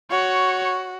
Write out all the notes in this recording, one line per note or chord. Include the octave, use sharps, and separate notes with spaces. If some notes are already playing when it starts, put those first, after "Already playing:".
F#4 C#5